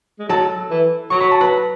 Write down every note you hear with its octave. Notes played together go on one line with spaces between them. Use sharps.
G#3
F#3 A4 A5
E3
F#3 C#6
B5
A5
B4 B5